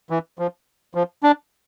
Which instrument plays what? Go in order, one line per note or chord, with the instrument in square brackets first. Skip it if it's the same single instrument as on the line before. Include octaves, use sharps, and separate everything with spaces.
[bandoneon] E3
F3
F3
D4